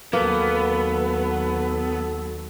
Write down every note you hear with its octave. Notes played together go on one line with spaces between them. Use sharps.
D#2 F#3 A#3 B3 A4